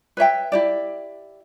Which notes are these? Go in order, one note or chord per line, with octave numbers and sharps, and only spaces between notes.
B4 C#5 E5 G5
E4 G4 D5